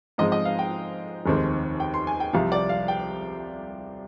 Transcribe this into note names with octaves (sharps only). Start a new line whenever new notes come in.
G#2 F3 G#3 C4 D#5
D#5
F5
G5
F1 D#2 D#3 G#3 C4
G5
C6
G#5
G5
C2 C3 F3 F5
D5
F5
G5